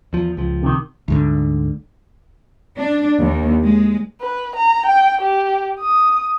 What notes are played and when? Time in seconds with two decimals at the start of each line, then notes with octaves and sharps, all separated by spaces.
0.13 E2 F3
0.37 C#2 F3
0.63 C3 D#3
1.08 D2 G#2 D3
2.76 D4
3.19 D#2
3.65 G#3
4.21 B4
4.56 A#5
4.86 G5
5.21 G4
5.80 D#6